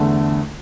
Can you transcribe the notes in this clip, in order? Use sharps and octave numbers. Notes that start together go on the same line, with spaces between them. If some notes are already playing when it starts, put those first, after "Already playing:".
Already playing: E2 D3 A3